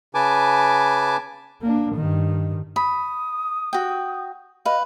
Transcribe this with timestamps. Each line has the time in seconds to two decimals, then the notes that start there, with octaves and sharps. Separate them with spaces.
0.15 C#3 B4 G#5 A5 D6
1.62 A#3 D4
1.96 G2 D#3
2.76 B5 D#6
3.73 F#4 G5
4.65 B4 D#5 F5